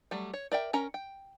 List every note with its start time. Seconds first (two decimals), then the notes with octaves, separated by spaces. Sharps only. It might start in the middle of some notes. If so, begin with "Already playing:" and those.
0.11 F#3 G3 A3
0.34 C#5
0.52 A#4 D5 E5 G5
0.73 C#4 A#4 A#5
0.94 G5